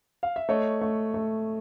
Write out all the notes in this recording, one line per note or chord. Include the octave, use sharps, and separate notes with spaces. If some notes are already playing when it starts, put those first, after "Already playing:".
F5
E5
A3 C#5 D#5
A3
A3